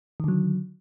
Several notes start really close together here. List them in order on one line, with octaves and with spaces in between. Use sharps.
D#3 D3 F#3